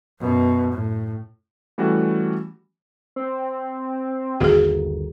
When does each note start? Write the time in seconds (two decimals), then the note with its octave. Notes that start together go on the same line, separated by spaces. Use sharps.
0.20 F#2 B2
0.73 A2
1.78 E3 G3 A3 C#4 F#4
3.16 C4
4.40 G1 D#2 A#3 F#4 G#4